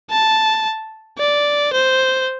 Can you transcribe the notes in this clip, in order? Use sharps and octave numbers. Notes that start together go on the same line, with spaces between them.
A5
D5
C5